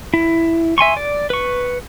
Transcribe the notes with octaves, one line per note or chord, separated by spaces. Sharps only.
E4
E5 G#5 C6 C#6
D5
B4 C#6